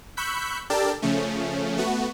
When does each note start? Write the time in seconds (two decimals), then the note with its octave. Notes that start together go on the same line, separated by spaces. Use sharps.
0.17 B5 C#6 E6 F#6 G6 B6
0.70 D4 G4 A4 A#4 D5 A5
1.02 C#3 F3 A3 C#4
1.77 A3 B3 F#4